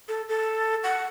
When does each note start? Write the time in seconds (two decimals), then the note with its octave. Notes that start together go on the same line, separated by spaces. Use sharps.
0.08 A4
0.29 A4
0.84 F#5